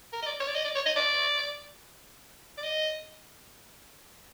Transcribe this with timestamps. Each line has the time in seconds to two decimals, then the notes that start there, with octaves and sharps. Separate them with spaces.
0.13 A#4
0.22 D#5
0.26 D5
0.40 C#5
0.47 D5
0.55 D#5
0.65 D5
0.75 C#5
0.86 D#5
0.96 D5
2.58 D5
2.63 D#5